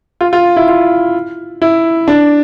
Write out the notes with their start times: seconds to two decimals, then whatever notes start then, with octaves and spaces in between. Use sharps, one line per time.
0.21 F4
0.33 F4
0.56 E4
0.68 F4
1.62 E4
2.08 D4